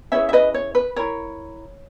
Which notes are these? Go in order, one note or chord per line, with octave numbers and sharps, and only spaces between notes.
C#4 E4 G#4 B4 C#5 E5
E5
B4 D#5
C#5
B4
E4 A#4 C#5